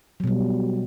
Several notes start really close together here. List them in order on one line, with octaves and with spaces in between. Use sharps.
F#3 B2 G3